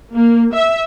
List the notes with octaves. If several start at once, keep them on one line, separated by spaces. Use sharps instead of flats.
A#3
E5